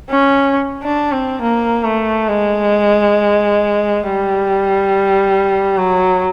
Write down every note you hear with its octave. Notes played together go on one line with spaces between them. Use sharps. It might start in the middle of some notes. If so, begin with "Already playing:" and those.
C#4
D4
C4
A#3
A3
G#3
G3
F#3